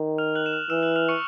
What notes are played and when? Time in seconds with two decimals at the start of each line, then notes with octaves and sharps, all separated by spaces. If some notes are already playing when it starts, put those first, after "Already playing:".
Already playing: D#3
0.18 F6 F7
0.35 F#6 F#7
0.46 E7
0.52 F6 F7
0.70 E3 E6 E7
0.83 F#6 F#7
0.96 F6 F7
1.09 C#6 C#7